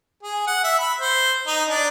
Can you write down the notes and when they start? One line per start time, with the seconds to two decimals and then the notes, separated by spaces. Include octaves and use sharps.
0.23 G#4
0.47 F#5
0.64 E5
0.79 B5
1.00 C5
1.47 D#4
1.69 D4